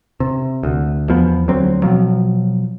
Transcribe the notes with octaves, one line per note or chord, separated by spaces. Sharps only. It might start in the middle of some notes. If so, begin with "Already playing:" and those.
C3
D2
E2 F3 B3
D2 F#3 C4
B2 F3 F#3